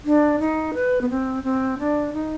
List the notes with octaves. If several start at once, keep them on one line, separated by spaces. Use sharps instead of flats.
D4
D#4
B4
B3
C4
C4
D4
D#4